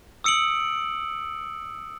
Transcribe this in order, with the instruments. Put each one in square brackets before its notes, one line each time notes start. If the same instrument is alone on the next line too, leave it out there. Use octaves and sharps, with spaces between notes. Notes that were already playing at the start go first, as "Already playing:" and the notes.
[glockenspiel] D#6 E6 C#7 D7 F#7